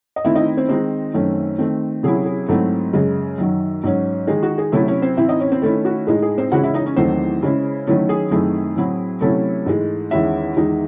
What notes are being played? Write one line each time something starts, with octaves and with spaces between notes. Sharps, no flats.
D#5
D#3 A3 C4 E4 E5
D#4 D#5
C4 C5
D#3 G#3 C4 D#4 C5
F#2 D#3 A3 C#4
D#3 A3 C4
C3 F#3 C#4 E4 G#4
G#4
G#2 F#3 A3 C4 E4 A4
F#2 C#3 G#3
F#2 D#3 F#3
G#2 F#3 C#4
D#3 G#3 D#4 G#4
F#4
G#4
C3 F#3 A3 C#4 E4 A4
C#4 C#5
C4 C5
A2 E3 C4 E4 E5
D#4 D#5
C#4 C#5
C4 C5
D#3 A3 C#4 E4 A4
F#4
A2 G#3 D#4 G#4
G#4
C4 C5
C#3 E3 G#3 C#4 E4 F#4 F#5
E4 E5
D#4 D#5
C#4 C#5
E2 D#3 F#3 A3 C4 C5
C#3 G#3 C#4 E4
D#3 F#3 A3 C#4 E4 A4
G#4
F#2 D#3 A3 C4 E4 G#4
A2 F#3 C4 E4
C3 F#3 A3 C#4 E4 A4
G#2 E3 G#3
E2 D#3 G#3 C#4 E4 E5
E2 D#3 G#3 D#4